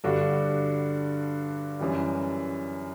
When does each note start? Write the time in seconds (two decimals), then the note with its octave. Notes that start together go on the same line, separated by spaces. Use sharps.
0.04 G2 D3 G3 D4 F#4
1.79 F#2 E3 G3